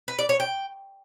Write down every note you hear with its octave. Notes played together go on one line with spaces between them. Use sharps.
B4
D5
C#5
G5